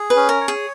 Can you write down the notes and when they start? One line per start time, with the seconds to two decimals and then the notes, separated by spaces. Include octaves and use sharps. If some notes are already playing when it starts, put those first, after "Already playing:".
Already playing: G#4
0.10 B4
0.16 C#4
0.29 A#4
0.41 C#5
0.48 G#4